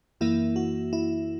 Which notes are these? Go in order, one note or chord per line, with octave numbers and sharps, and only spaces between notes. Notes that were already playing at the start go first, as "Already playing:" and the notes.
F#2 E3 A#3 E4
F#4
E4